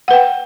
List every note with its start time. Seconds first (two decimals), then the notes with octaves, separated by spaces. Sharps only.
0.08 F#5
0.11 B4
0.13 G5